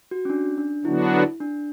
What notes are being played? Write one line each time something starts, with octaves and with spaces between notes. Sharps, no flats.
F#4
C#4
D4
D4
D3 F#3 B3 D4 E4 F#4
D4